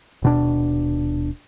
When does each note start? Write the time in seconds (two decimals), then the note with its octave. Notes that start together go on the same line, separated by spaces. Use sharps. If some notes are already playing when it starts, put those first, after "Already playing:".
0.22 D#1 B2 D4